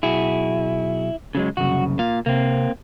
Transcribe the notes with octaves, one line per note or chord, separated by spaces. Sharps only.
B1 E4 F#4 G#4
C#3 F#3 G#3
C2 F#2 C#3 F#4
A#2 F5
C3 A#3 C4